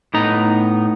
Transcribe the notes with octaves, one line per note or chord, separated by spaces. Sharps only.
A2 B3 D#4 A#5